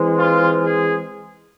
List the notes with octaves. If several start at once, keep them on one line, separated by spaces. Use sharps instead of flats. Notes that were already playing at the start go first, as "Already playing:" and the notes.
Already playing: E3 G#3 C4
F4
G#4